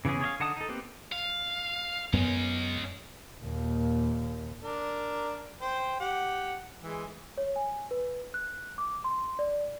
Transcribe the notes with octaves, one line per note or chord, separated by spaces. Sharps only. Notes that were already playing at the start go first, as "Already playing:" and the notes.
C#3 E3 B3 C#4 G#4
G#4 C#5 D#5 F5
D3 D#4 F#5 A5 D#6
D#4 A4
A#3 C4 G4 B4
F5
F#2 G#3 B3 C#4
D#2 A#2
D4 A#4
C5 G5
G4 F#5
E3 G#3
C#5
G#5
B4
F#6
D6
C6
D5